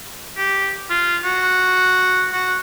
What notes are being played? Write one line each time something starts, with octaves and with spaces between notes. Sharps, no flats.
G4
F4
F#4
F#4